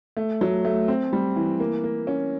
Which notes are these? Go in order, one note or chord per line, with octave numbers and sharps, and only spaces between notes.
A3
F#3
A3
C4
G3
E3
A#3
A#3
C#4